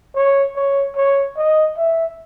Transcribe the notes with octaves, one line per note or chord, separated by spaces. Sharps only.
C#5
C#5
C#5
D#5
E5